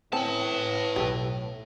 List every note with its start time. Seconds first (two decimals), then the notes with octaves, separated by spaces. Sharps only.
0.13 A2 C4 C#4 B4 A5
0.96 B1 G4 A4